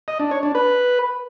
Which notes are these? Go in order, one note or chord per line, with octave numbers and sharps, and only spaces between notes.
D#5
D4
C#5
D4
B4